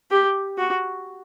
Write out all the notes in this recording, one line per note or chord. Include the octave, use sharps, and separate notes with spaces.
G4
F#4